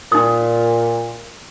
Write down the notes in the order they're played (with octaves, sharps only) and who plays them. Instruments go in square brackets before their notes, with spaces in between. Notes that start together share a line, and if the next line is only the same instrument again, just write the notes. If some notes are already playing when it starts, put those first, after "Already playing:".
[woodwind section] A#2 [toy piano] D#4 D#6